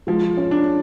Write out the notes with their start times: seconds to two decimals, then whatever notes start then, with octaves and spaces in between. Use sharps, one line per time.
0.07 F3 G#3
0.37 C#4
0.51 D4